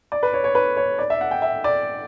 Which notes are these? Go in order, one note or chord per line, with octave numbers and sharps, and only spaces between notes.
D5
B4
C#5
C#5
B4
C#5
D5
E5
F#5
G5
E5
D5